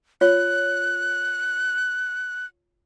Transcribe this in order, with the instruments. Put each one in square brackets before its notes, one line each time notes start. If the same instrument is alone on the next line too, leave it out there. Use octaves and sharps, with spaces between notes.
[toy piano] F4 C#5 [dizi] F#6